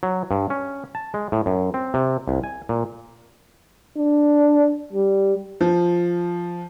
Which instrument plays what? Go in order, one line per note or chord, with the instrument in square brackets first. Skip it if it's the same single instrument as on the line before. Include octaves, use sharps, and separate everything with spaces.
[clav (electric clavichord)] F#3
G2
C#4
A5
G#3
A2
F#2
C4
C3
C2
G#5
A#2
[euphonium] D4
G3
[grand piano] F3